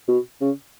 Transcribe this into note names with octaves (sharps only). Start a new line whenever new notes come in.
B2
C#3